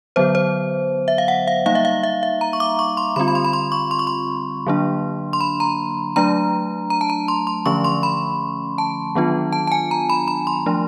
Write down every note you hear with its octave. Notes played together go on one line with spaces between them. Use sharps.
D3 F#3 B3 C5
C5
E5
F5
F#5
F5
G3 A#3 D#4 F5
E5
F5
E5
E5
A#5
C#6
D6
C#6
C6
D3 G3 C4 F4 B5
B5
C6
B5
C6
C#6
C6
C#6
C6
D3 F#3 A#3 D4
C6
B5
A#5
F#3 A3 D4 A#5
A#5
A5
A#5
C6
C6
D3 F3 A3 C#4 C#6
C6
B5
A5
D#3 F#3 B3 D4 F4
A5
A5
G#5
A#5
B5
B5
C6
F3 A3 D4